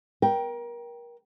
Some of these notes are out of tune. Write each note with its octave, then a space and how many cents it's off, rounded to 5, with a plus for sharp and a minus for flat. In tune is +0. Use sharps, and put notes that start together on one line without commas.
A#4 +30 G5 -5